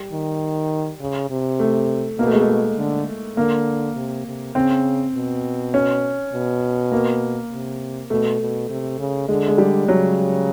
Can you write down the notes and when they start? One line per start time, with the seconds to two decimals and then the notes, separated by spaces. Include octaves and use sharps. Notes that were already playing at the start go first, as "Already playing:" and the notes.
Already playing: G3
0.12 D#3
1.00 C#3
1.30 C3
1.60 A3
2.18 B2 A#3
2.27 A3
2.33 G#3
2.41 A3
2.78 D3
3.37 D3 A#3
3.96 C3
4.26 C3
4.55 C#3 C4
5.15 B2
5.74 C#4
6.33 B2
6.92 A#3
7.51 C3
8.10 B2 A3
8.40 B2
8.69 C3
8.99 C#3
9.28 D3 G#3
9.48 G#3
9.58 G3
9.88 C#3 F#3